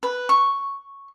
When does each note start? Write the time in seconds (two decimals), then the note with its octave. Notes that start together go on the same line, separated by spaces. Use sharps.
0.03 B4
0.29 C#6